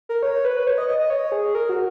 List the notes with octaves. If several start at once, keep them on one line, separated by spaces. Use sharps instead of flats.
A#4
C#5
B4
B4
C#5
D#5
D#5
D#5
C#5
G#4
A#4
F#4